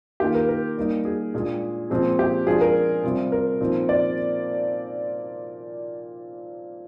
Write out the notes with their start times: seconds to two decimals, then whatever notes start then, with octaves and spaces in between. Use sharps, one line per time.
0.20 D#3 A#3 F4 G4
0.34 A#4
0.49 A#4
0.77 G3 A#3 D#4
1.05 G#4
1.34 A#2 G#3 D4
1.90 A#2 F3 G#3 C4
2.19 G4
2.47 F3 G#3 D4 F4 G#4
2.61 A#4
3.04 C3 G3 C4 F4
3.32 A#4
3.60 A#2 F3 C4 D#4
3.89 D5